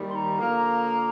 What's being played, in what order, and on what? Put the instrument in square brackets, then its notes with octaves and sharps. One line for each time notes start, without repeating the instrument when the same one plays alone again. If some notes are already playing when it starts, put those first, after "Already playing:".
Already playing: [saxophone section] D#2 D#3 G3
[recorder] C6
A#5
[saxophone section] D3 F3 A#3